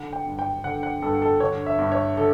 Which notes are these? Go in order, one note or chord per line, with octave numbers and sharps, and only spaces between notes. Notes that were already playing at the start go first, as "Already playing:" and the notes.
Already playing: D3 F#5
G5
G2
G5
D3 F#5
F#5
G2 A4
A4
D3 C#5
E5
G2
C#5
D3 A4